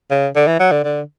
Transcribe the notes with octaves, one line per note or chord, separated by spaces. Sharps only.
C#3
D3
E3
F#3
D3
D3